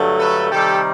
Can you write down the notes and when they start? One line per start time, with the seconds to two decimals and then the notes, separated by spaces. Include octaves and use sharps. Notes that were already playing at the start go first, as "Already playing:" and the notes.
Already playing: G2 D3 F#3 A3
0.18 A4 B4
0.49 C3 D#3 G3 G4 A4